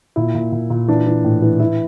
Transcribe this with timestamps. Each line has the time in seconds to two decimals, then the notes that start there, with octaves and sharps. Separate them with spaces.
0.16 A#2 E4
0.35 A#2
0.52 A#2
0.70 A#2
0.88 E3 D4
1.06 E3
1.24 A2
1.42 E3
1.60 E3 E4